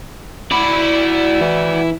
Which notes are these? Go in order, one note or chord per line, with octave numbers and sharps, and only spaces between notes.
E4 F#4 D5 B5
E3